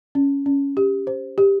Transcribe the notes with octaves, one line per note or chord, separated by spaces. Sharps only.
C#4
C#4
G4
C5
G4